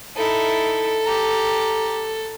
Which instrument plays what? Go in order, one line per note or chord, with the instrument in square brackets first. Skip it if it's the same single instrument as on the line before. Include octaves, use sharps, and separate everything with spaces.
[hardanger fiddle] D#4 E4 [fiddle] A4
[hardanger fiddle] G4 A#5